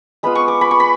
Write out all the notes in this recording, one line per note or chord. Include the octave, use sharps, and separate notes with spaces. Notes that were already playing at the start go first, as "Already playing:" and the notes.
G#3 B3 F4 B5
C#6
D6
B5
C#6
B5